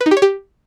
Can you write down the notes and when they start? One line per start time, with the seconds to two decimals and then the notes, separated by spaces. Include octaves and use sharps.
0.01 B4
0.06 D#4
0.11 G4
0.17 C#5
0.22 G4